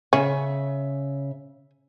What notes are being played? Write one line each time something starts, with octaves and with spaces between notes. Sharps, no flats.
C#3 C#4 E5